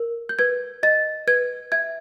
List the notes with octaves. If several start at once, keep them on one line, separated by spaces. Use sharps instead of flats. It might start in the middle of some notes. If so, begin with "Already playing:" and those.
Already playing: A#4
G6
B4 G#6
D#5 A6
B4 G#6
E5 G#6